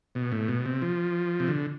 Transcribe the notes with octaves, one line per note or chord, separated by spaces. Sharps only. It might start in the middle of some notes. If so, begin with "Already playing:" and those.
B2
A2
B2
C3
F3
C3
D3